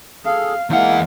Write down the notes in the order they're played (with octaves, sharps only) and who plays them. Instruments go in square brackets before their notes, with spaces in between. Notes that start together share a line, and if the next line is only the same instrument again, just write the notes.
[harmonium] G#4 A4 [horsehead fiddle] F5
[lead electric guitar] E2 F#5 [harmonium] G#3 A#3 [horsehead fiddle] E4 F5